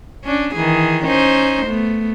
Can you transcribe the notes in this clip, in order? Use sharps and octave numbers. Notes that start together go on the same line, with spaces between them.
C#4 D4
D#3 E3 G#4
C#4 D#4 C5
A3 B3